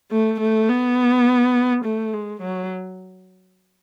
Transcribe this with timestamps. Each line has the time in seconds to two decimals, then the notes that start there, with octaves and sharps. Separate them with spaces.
0.11 A3
0.40 A3
0.70 B3
1.85 A3
2.14 G#3
2.42 F#3